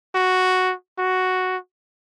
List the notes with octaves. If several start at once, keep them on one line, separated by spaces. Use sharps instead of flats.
F#4
F#4